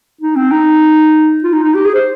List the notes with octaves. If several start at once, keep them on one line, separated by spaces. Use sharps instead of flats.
D#4
C4
D#4
F4
D#4
D#4
G4
G#4
C5